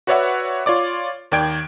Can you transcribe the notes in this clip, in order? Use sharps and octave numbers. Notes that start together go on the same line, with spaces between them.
F#4 B4 C#5 D5 E5 F#5
F4 C#5 D5 D6
D#2 D#3 D5 G5 G#6 D7